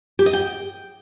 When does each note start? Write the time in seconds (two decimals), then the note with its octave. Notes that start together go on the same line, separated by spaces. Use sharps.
0.19 G4
0.26 D#5
0.33 G5